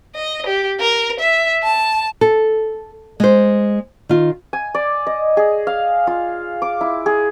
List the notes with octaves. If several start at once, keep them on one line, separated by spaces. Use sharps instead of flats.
D#5
G4
A#4
E5
A5
A4
G#3 C5
D#3 F4
G#5
D5
D#5
G#4
F5
F4
D6
E4
G#4